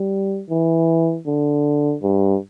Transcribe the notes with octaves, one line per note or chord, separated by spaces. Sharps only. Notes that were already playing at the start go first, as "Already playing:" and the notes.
Already playing: G3
E3
D3
G2